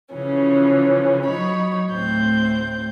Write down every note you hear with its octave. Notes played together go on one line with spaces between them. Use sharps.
C#3 E3 F3 C#4
F#3 D#4 C#5 B5
D2 A2 C4 G6